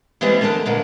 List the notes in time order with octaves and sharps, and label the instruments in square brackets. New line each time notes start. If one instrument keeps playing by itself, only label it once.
[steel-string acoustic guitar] E3 G3 G#3 B3 C4
D3 A3 D4 A#4 A5
A#2 D3 G#3